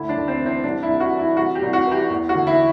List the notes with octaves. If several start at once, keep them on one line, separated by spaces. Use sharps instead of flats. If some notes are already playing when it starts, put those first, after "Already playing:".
Already playing: D2 E4
D4
D2
C4
E3
C4
C2 D4
E4
C2
F#4
E3
E4
C2 F#4
G4
C2
F#4
E3
G4
E2
F#4
D3
E4